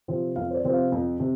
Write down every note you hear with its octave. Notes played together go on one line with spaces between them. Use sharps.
C3 F3 C4
F2 F5
C5
D5
C3 F3 C4
F5
F2
C3